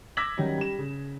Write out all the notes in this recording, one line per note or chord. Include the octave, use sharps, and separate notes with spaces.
D6 E6 G#6 A#6 B6 F#7
D#3 F#3 G3 C#4 D#4
G3 E7
C#3